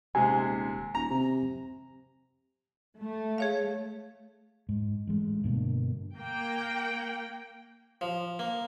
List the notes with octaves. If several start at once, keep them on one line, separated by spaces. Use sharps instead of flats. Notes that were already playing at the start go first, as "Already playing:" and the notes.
D#1 C3 G#3 G#5
D#1 A#5
C3
A3
G#4 C#5 F5
G#2
A1 G#3
G2 B2 D3 A#3
A#3 G5
F3
A#3